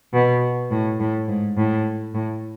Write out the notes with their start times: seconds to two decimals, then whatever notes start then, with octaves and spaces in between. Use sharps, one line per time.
0.14 B2
0.71 A2
1.00 A2
1.28 G#2
1.57 A2
2.15 A2